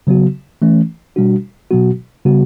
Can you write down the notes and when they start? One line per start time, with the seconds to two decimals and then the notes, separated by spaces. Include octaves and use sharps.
0.07 C#3 F#3 B3 F#4
0.62 E3 A3 C#4
1.16 B2 G3 D4 F#4
1.71 B2 F#3 B3 F#4
2.25 C#3 G3 B3 F#4